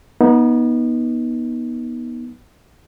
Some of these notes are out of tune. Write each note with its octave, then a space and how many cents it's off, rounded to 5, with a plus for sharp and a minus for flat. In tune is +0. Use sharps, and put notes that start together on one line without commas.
B3 -25 D#4 +10